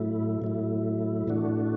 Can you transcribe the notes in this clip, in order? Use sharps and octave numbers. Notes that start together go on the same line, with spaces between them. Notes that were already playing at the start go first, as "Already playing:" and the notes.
Already playing: A2 F#3 A3 E4
A2 F#3 A3 E4
A2 E3 A3 D4 F#4